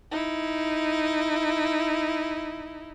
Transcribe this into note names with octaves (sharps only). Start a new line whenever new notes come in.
D#4 E4